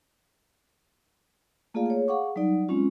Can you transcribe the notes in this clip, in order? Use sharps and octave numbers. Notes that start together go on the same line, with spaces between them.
A3 A#3 F4 G#4 D5 F5
G#4 C#5
G#4 F5 F#5 C#6 D6
F#3 G3 D#4 D5
G#3 C4 C#4 F4